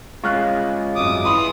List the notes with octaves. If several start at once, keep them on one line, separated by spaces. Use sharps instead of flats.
G#3 F4 C#6 F6 F#6
G#1 F#2 D6 D#6
E3 B5 C6 D#6